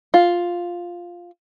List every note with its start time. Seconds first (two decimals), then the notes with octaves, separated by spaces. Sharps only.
0.14 F4